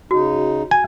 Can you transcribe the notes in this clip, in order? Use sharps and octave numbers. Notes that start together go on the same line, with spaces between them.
C#3 D#4 F#4
G#5